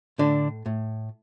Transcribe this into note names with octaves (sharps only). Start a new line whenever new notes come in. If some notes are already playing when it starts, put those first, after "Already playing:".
A2 D3 D4
A2